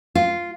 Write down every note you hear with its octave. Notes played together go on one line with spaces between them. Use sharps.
F4